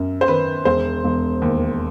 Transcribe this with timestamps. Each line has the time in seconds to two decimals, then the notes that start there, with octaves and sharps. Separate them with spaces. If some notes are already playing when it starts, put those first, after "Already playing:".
Already playing: F#2
0.21 C5
0.28 D#3 B4
0.65 E1 C5
1.05 E1
1.42 D#2